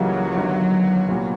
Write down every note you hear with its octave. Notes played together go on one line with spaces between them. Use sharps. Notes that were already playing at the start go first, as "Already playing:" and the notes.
Already playing: C#2 C#3 E3 F#3 G3 A#3
G1 G2 D#3
C2 A#2 G3 B3